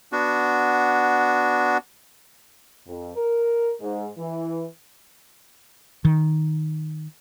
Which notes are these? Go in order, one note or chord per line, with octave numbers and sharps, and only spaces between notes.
B3 D4 F#4
F2
A#4
G#2
E3
D#3